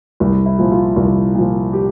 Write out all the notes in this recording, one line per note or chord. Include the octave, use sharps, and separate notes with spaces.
C2
E4
A#2 F3
F4
C2
A#2 F3
G4